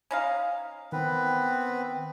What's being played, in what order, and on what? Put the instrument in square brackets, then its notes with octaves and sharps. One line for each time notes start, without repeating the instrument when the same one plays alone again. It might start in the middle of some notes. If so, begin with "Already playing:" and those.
[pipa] C#4 D#4 F5
[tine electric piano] D#3 [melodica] B3 C4 B4